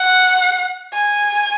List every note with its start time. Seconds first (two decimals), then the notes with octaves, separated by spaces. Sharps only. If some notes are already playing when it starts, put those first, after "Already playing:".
Already playing: F#5
0.93 G#5